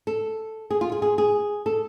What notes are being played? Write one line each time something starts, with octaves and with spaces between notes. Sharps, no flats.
A4
G#4
F4
G#4
G#4
G#4
A4